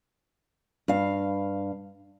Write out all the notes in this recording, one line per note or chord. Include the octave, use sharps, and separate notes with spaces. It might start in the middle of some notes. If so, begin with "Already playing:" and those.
G2 F5